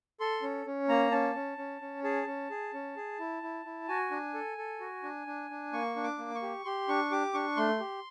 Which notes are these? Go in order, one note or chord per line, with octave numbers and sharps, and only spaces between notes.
A4 C6
C#4
C#4
A#3 A#5
C#4 A5
C#4
C#4
C#4
G#4 A5
C#4
G#4
C#4
G#4
E4
E4
E4
F#4 G#5
D4
A4
A4
F#4
D4
D4
D4
A#3 C#6
D4
D6
A#3
C#6
G4
G4 C6
D4 C#6
G4 D6
D4 C#6
A3 C6
G4